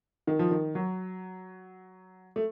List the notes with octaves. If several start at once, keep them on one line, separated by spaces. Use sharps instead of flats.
D#3
F3
D#3
F#3
A3